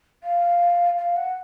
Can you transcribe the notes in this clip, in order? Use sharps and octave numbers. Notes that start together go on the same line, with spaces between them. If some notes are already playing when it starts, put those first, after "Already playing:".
F5
F5
F#5